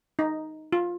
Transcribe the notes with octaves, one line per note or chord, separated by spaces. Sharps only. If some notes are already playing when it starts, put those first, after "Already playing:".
D#4
F4